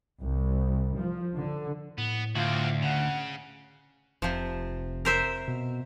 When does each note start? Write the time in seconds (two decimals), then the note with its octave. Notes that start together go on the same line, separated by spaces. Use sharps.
0.20 C2
0.98 F3
1.36 D3
1.98 A2 B3
2.35 D2 C4 F4 F#4
2.82 C#3 F#5
4.22 F1 C3 F3
5.05 A#4 C5 E5
5.48 B2